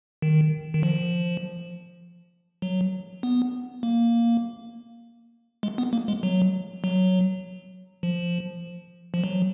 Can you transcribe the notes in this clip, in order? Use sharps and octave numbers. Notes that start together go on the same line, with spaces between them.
D#3
D#3
F3
F#3
B3
A#3
G#3
B3
A#3
G#3
F#3
F#3
F3
F3
F#3